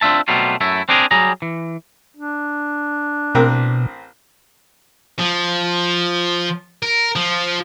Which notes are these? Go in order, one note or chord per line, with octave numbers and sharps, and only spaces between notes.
C4 D4 F4 E5 A5
B2 F#3 G3 A3 C4 F4
F#2 A3 E4
C4 D4 G4 G#4 A#4
F#3 G3 G#4 A#5
E3
D4
A1 B2 C4 A#4
F3
A#4
F3